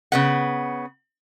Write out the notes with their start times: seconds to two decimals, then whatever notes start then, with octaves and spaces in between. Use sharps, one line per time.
0.12 C#3 B3 F#5